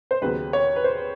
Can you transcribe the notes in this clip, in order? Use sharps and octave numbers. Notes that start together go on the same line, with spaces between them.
C5
D#2 C#3 F#3 B3 B4
C#5
B4
C5